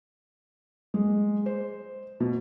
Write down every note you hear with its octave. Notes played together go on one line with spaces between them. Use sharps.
G#3
C5
B2